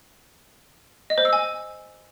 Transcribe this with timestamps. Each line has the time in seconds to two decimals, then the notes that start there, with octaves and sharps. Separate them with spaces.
1.10 D#5
1.18 C5
1.25 E6
1.33 G#5